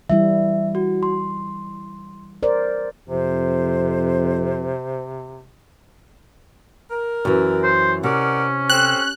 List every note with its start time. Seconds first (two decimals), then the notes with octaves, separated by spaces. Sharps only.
0.10 E3 G3 E4 E5
0.75 F#4
1.03 C6
2.43 A#4 C5 D5
3.09 F2 C3 C5
6.90 A#4
7.25 F#2 E3
7.64 C5
8.03 C3 C#4 A#4 D5 F#5
8.70 C4 A4 C5 F#6